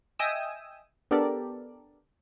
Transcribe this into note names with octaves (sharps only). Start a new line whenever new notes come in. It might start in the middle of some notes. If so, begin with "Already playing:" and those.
D#5 E5 G5 G#5 D#6 E6
B3 D4 G4 A4 A#4 D5